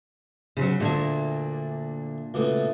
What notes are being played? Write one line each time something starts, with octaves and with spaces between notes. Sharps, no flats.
C#3 F3 F#3
D2 A#2 A#3 D4 E5
C#2 B2 A3